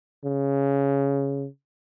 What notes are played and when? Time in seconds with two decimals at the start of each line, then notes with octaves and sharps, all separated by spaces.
0.25 C#3